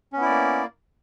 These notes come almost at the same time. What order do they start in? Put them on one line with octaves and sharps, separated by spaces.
C#4 B3 E4 D5 A#3